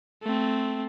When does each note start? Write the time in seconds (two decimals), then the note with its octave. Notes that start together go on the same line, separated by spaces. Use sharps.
0.22 A3 C4